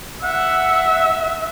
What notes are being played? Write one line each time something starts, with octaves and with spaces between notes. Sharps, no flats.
E5 F#5